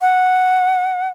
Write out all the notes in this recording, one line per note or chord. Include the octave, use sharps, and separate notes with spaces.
F#5